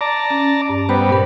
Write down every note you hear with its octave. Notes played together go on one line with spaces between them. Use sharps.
D5 A5 A#5
C#4
G2
G3 B3 C5
A#2 A#4